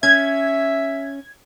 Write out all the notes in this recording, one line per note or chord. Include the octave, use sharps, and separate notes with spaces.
C#4 E5 G#6